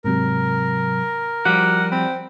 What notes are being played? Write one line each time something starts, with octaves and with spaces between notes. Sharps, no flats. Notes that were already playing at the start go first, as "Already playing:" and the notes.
G#2 C3 F#3 A#4
F3 G3 F#4 D5 F#5
C4 B5